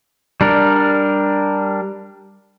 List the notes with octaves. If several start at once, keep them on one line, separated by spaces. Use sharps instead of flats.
G3 D4 A#4